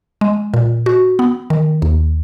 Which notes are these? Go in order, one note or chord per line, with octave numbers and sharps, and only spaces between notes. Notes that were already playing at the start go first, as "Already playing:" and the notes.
G#3
A#2
F#4
B3
D#3
D#2